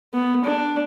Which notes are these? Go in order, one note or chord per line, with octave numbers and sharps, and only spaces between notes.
B3
D4